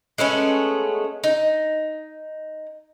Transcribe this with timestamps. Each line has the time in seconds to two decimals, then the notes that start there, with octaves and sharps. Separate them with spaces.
0.18 G#3 A3 B3 C#4
1.24 D#4